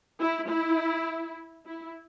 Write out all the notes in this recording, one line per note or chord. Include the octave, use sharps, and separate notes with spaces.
E4
E4
E4